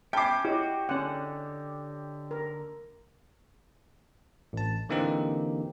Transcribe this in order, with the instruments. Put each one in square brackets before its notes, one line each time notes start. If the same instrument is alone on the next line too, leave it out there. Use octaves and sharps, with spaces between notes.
[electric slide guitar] C#4 [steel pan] E5 [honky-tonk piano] G5 D6 [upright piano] A5 B5 C7
[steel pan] E4 [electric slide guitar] F#4 [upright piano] G4 C#5 D#5
[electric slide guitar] D3 [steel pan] C#4 F#5
[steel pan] A#4
[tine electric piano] A1 A5
D3 E3 A#3 C4 D#4 G4